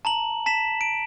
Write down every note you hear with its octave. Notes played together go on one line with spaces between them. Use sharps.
A5 A#5 F#7
A5 B6 E7
D7